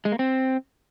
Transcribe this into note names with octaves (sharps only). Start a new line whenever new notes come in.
G#3
A#3
C4